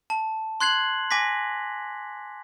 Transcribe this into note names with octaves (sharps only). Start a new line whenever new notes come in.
A5
C6 F#6 G#6 C7 F#7
G#5 D6 A#6 B6